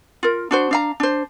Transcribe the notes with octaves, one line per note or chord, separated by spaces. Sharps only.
F4 A#4
D4 F#4 C5
D4 F5 A#5
D4 C5